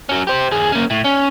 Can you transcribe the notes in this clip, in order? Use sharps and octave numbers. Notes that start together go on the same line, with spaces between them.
F#3 C#4
G4 C5
D#2 G#4
A#3 C#4
A2
C#4